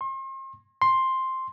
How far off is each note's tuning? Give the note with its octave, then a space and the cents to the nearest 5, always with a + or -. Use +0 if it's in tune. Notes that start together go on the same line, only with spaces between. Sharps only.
C6 +40
C6 +5